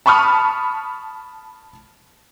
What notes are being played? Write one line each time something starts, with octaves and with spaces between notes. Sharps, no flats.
A5 B5 C#6 D#6 F6